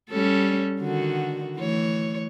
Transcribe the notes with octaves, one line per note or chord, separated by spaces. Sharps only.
G3 C#4 A4
D3 D#3 F#4
E3 A3 C#5